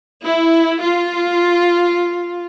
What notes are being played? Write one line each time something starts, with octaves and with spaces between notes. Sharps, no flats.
E4
F4